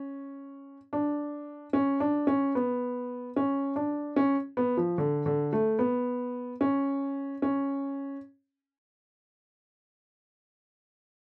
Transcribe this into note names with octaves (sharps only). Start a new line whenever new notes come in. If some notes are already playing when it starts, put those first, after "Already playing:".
Already playing: C#4
D4
C#4
D4
C#4
B3
C#4
D4
C#4
B3
F3
D3
D3
A3
B3
C#4
C#4